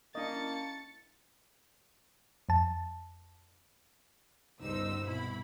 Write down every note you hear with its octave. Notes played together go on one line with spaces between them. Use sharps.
A#3 C#4 D4 E4 D#5 A5 A6 C#7
F2 A5
G1 C#2 G3 D#4 C5 E6
C2 B2 E4 B5